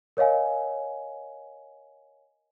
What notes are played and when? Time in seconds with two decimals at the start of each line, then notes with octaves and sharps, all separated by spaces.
0.17 A#4 C#5 D#5 F5 G#5